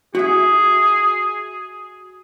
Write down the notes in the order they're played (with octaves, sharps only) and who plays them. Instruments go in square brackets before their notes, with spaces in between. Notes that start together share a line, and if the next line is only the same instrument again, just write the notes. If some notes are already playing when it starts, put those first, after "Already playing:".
[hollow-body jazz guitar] F#4 E5 [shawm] G#4